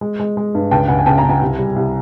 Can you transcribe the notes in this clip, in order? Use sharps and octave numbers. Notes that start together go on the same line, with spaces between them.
G#3
G#3
G#3
G2
C#2 G5 A5
C#2 F#5 G#5
G#5
C#3 G5 A5
G#5 A#5
C#3
G#5 A#5
C2
G3
C2